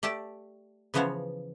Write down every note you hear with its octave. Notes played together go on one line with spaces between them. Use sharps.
A3 G4 D5 G5 A5
C#3 E3 F3 B3 C5 C#5